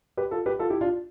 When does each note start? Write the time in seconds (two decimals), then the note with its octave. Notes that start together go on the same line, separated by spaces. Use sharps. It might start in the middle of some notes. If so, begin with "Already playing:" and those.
0.17 G4 B4
0.31 F4 A4
0.46 G4 B4
0.59 F4 A4
0.70 E4 G4
0.81 D4 F4